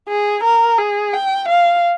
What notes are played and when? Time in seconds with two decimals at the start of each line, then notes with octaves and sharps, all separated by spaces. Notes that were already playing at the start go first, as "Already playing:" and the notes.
0.09 G#4
0.44 A#4
0.78 G#4
1.13 G5
1.49 F5